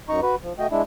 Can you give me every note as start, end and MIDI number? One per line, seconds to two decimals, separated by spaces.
0.09 0.20 42
0.09 0.20 63
0.09 0.20 82
0.09 0.20 85
0.23 0.35 66
0.23 0.35 71
0.43 0.53 53
0.59 0.67 57
0.59 0.67 66
0.59 0.67 75
0.59 0.67 79
0.71 0.82 56
0.71 0.82 62
0.71 0.82 64